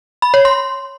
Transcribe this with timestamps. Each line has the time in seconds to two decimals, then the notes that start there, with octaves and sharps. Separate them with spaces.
0.22 B5
0.34 C#5
0.45 C6